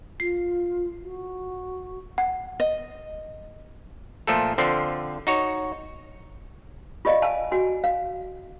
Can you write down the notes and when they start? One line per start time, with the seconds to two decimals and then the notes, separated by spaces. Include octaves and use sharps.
0.20 F4 C7
1.02 F#4
2.18 F#5
2.60 D#5
4.27 A#2 F3 A3 A4
4.58 D3 F3 C4
5.27 D#4 F#4 C#5
7.05 F4 G4 D5 D#5 F5
7.22 F5 G#5 A5
7.52 F#4 G#5
7.84 F5